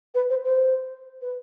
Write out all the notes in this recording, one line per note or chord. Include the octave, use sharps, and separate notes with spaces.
B4
C5
C5
B4